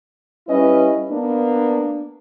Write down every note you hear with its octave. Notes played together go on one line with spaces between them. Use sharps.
G3 C#4 E4 B4 D#5
A#3 B3 D4